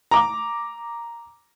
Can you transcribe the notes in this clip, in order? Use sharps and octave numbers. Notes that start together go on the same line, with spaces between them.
A#5 D6